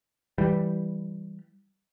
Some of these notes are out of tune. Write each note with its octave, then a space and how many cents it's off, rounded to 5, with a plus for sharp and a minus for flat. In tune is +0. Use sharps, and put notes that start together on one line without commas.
E3 +0 G3 +0